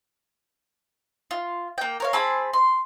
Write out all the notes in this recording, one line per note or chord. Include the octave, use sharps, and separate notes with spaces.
F4
A#3 G5
A#4 C#5 F5
C4 G#4 A5 B5
C6